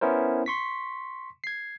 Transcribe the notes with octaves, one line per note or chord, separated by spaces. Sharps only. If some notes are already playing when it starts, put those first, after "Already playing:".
B3 C#4 E4 A#4 C5
C6 C#6 B6
G#6 C7